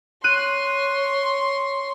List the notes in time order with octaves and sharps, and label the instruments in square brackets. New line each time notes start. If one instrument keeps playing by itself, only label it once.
[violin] C#5 C6 [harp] F#6 D#7